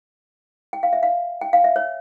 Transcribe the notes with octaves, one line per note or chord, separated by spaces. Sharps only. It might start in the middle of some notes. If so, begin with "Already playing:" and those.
G5
F5
E5
F5
G5
F5
E5
C#5